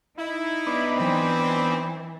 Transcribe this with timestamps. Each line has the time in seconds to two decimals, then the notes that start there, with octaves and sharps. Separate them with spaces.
0.18 D#4 E4
0.67 B3 D4
0.97 E3 C4